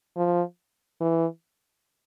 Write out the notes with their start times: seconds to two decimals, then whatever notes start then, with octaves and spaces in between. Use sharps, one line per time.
0.17 F3
1.00 E3